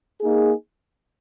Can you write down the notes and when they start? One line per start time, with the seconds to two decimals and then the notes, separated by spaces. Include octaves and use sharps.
0.20 A#3 D#4 G#4